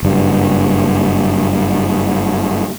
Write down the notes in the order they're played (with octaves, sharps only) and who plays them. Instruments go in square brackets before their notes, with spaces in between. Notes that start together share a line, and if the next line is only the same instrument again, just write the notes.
[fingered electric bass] F#1 G2